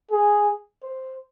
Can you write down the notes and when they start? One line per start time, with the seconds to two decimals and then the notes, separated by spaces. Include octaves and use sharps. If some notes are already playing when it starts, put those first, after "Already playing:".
0.11 G#4
0.83 C5